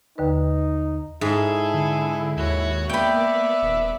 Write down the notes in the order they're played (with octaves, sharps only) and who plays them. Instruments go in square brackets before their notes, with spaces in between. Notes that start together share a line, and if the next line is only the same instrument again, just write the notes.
[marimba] D#2 D3 B4 [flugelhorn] D#4
[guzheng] G#2 [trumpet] E4 [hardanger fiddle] G#4 A4
[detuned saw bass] D3
[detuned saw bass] D#2 [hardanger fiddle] F#4 C#5
[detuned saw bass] A#3 [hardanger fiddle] B3 D5 [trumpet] E5 [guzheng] G5 B5
[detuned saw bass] D#1